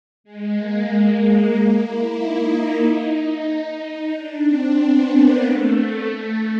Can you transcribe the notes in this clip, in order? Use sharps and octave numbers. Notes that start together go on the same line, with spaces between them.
G#3
A#3
A#3
A#3
E4
D#4
D#4
D4
C4
B3
A#3
A3
A3